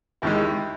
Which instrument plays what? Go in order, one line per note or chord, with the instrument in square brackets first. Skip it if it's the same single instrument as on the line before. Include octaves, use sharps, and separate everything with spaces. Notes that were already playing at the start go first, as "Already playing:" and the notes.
[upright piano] D#2 D#3 G#3 E4